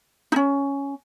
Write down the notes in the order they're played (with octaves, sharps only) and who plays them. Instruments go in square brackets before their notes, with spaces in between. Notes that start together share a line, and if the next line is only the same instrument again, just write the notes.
[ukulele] C#4 D#4